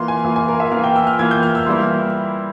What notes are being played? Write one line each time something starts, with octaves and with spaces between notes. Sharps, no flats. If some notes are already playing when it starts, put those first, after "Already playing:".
Already playing: E3 A#3 F4 C6
G#5
E3 A#3 F4
G#5
A#4
E5
E3 A#3 F4 F5
G5
E6
F6
E3 A#3 F4 G#6
G6
F6
E6
E3 G3 A#3 E4 C6